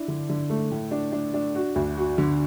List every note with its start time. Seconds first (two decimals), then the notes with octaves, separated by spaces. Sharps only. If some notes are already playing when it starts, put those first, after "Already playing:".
Already playing: D4 E4
0.08 D3
0.29 D3
0.50 A3
0.71 A2
0.91 D4
1.12 D4
1.34 D4
1.55 F#4
1.75 D2
1.97 F#4
2.18 D3